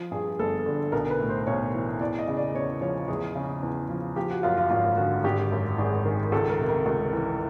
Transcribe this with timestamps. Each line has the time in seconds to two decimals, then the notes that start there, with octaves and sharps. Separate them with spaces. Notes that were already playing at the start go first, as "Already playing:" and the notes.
Already playing: F3
0.11 G2 G#4
0.39 G1 A4
0.66 D3
0.92 B1 A#4
1.10 B4
1.20 A2
1.29 C5
1.47 B1 C#5
1.74 E3
2.00 E2 D5
2.19 D#5
2.28 C#3
2.37 D5
2.54 E2 C#5
2.81 F3 C#5
3.08 E2 G#4
3.36 C#3
3.63 E2
3.89 F3
4.16 F3 G4
4.31 F#4
4.43 F#2 F4
4.58 F4
4.70 G#1 F4
4.97 D3 F#4
5.24 G#1 G4
5.52 F#2
5.78 G#1 G#4
6.05 D#3
6.32 C#2 A4
6.50 A#4
6.60 C3
6.68 A#4
6.86 C#2
7.13 E3